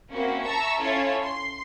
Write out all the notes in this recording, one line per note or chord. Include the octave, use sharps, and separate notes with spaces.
A#3 C4 C#4 E4 F#4
E5 A5 A#5 C#6 E6
C#4 E4 F4 A4 C#5
C6